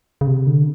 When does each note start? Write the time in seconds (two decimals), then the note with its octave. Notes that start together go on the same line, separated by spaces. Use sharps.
0.21 C#3
0.27 C3
0.47 D3